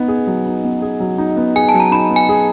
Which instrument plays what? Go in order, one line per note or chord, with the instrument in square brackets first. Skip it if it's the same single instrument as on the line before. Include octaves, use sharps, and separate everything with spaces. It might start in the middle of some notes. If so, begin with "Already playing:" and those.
Already playing: [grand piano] B3 D#4
G#4
F#3
D#4
B3
G#4
F#3
D#4
B3
[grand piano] G#4 [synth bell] G#5
[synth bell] A5
[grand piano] F#3
[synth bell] A#5
[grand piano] D#4 [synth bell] B5
[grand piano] B3
[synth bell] G#5
[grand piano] G#4